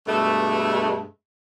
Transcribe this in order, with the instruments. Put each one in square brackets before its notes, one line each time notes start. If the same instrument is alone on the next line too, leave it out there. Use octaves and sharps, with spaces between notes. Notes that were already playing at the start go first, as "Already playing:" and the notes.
[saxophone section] G2 B2 G#3 A3